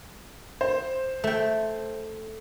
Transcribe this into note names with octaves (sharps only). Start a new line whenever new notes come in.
C5
A3 G5